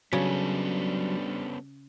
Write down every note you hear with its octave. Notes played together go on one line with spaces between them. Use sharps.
C#3 F#3 G3 B3 C#4 D4 A4